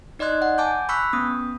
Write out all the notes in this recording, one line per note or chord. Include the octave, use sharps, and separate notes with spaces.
D#4 D5 D#5 C6 F#6 G#6
F#5
G#5 A5 D6 G6
B5 C#6 E6 F#6 B6
B3 C#4 D#6